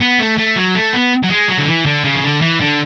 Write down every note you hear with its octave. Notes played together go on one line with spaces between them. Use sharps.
B3
A3
A3
F#3
A3
B3
F#3
G#3
F#3
D3
E3
D3
C#3
E3
D3
E3
D3